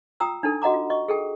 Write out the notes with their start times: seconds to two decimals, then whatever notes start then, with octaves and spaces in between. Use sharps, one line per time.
0.20 F4 G5 A#5 D#6 E6
0.43 D4 D#4 A4
0.62 F#4 D#5 F#5 A#5 D6
0.74 F4
0.90 D#5 C#6
1.08 G#4 A4 G5